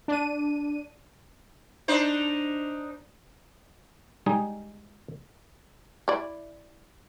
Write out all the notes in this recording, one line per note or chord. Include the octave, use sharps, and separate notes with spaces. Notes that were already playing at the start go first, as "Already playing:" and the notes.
D4 D#7
D4 D#4 C5
G3 G#3 D#4 G#4
E4 D5